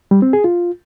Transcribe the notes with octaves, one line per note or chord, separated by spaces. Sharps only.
G3
C4
G#4
F4